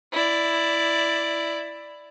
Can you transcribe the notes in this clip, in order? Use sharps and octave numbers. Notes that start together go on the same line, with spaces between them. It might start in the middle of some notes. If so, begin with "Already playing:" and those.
E4 D5